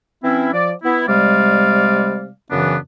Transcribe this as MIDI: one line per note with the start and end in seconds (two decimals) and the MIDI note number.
0.24 0.51 52
0.24 0.51 60
0.24 0.51 61
0.24 0.51 64
0.53 0.72 53
0.53 0.72 74
0.83 1.04 59
0.83 1.04 64
1.07 2.30 48
1.07 2.30 55
1.07 2.30 56
1.07 2.30 74
1.07 2.30 77
2.51 2.76 42
2.51 2.76 49
2.51 2.76 52
2.51 2.76 59
2.51 2.76 62